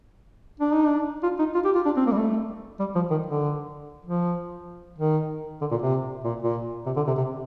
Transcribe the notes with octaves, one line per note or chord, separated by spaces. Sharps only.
D4
D#4
D4
F4
D#4
F4
G4
F4
D4
C4
A#3
G3
A3
G3
F3
D#3
D3
F3
D#3
D3
A#2
C3
A#2
A#2
C3
D3
C3
C3